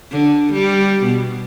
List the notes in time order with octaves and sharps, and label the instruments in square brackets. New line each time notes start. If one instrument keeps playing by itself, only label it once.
[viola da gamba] D3
G3
B2